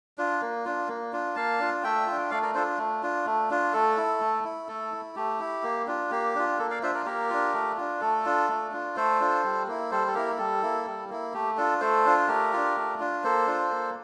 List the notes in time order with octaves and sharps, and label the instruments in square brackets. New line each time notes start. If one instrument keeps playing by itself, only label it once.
[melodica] D4 F4
A#3
D4 F4
A#3
D4 F4
A#3 F5 A5
D4 F4
A3 E5 G5
D4 F4
A3 D5 F5
A#4 D5
D4 F4 A4 C5
A3
D4 F4
A3
D4 F4
A3 A4
E4
A3
E4
A3 A4
E4
A3 G4
E4
A#3
D4 F4
A#3 G4
D4 F4
A#3 A4
D5 F5
D4 F4 C5 E5
A#4 D5
A#3 G4 A#4
D4 F4
A3
D4 F4
A3 A4
D4 F4
A3
D4 F4
A3 A4 C5
D4 F4
G3
A#3 E4
G3 A4 C5
A4
A#3 E4 G4 A#4
G3 A4
A#3 E4
G3
A#3 E4
A3 G4
D4 F4 A4
A3 A4 C5
D4 F4
A3 G4 A#4
D4 F4
A3
D4 F4
A#3 A4 C5
D4 F4
A#3